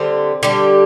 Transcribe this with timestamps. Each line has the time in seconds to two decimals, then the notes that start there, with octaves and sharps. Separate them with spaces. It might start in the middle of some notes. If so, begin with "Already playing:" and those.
Already playing: D3 G3 C4
0.43 D3 G3 G4